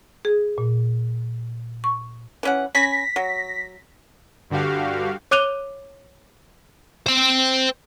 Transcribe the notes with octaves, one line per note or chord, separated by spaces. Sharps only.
G#4
A#2
C#6
E3 C#4 F#5
C#4 G#5 B5 A#6 B6
F#3
G2 D3 F#4 G4 F5
C#5 D6 F#6 D#7 F7 G7
C5 G5